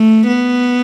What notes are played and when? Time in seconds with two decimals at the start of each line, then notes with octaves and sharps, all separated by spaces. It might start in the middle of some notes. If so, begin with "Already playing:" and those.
Already playing: A3
0.28 B3